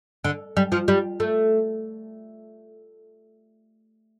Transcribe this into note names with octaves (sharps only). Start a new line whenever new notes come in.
D3
G3
F3
G3
A3